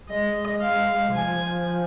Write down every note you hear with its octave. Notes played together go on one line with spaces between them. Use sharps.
G#3 D#5
F5
F3 G#5